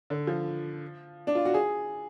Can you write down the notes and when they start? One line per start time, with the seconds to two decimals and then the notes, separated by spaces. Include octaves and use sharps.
0.10 D3
0.27 F3
1.27 D4
1.35 F4
1.45 F#4
1.54 G#4